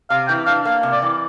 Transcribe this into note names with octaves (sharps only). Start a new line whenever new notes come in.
C3 F5
E3 G5
D4 F5
A#3 F5
C3
D5
E3